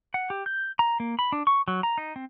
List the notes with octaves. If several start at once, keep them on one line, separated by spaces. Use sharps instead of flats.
F#5
G4
G6
A#5
A#3
B5
D4
C#6
F#3
A#5
D#4
C4